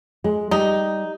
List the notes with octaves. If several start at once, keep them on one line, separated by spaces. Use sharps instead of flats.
G#3
G3 D#4